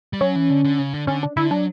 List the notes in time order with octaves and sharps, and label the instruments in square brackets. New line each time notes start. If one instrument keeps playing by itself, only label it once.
[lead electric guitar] G3
[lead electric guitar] F#3 [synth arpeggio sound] C#4
[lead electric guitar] E3
D3
D3
C#3
D3
[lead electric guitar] D3 [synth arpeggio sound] C#4
[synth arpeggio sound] D4
[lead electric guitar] D3 [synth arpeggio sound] E4
[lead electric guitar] F#3 [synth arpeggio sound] D4